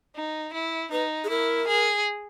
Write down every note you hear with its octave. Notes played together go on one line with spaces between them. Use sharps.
D#4
E4
D#4 B4
G#4
E4 A#4
G#4